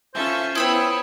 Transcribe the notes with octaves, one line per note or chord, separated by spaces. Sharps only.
C#4 F4 A4 C5 E5
B3 E4 C5 C#5 G5 B5 D#6 E6